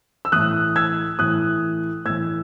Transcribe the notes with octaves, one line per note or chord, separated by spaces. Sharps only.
E6
A2 E3 D#6 F#6
E6 G#6
A2 E3 D#6 F#6
A2 E3 E6 G#6